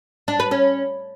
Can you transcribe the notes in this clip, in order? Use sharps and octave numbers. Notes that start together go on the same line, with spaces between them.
D4
B4
C#4